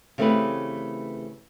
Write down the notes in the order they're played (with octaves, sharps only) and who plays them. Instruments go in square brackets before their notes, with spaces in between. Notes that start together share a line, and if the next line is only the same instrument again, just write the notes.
[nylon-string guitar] C#3 E3 A3 C4 G4 B4